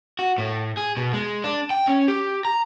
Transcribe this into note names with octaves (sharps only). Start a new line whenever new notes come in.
F#4
A2
G#4
B2
G#3
D4
G5
C#4
G4
A#5